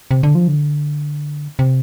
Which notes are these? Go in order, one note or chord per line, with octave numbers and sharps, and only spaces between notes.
C3
D3
F3
D3
C3